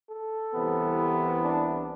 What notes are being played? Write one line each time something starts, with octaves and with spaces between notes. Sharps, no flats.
A4
C2 C3 E3 B3
D4